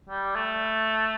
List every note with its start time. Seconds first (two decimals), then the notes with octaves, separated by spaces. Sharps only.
0.09 G3
0.36 A3